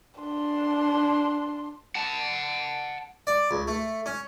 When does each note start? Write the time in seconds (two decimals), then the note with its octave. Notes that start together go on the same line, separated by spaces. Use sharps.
0.21 D4 C6
1.95 F#5 A5
3.27 D5
3.51 C#2
3.68 A3
4.06 C#4